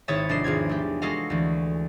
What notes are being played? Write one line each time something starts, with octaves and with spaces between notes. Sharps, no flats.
G#1 E4 C#5 E5 D#6 A6
F1 D4 D#5 C7 E7
G#1 E2 F4 G#6
A3 G4
G#3 F#4 A4 D#5 F5
D2 E3